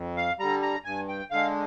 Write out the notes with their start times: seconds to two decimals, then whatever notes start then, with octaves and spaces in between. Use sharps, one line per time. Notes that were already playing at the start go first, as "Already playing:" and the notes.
Already playing: F2
0.17 F5
0.39 D3 G3 A#5
0.62 A#5
0.84 G2 G#5
1.09 G5
1.31 D3 G#3 F5